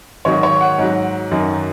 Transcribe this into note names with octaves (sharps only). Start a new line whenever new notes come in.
G#2 D#3 F#3 C#5
C#5
F#5
G#2 F#3
F#2 D#3 F#3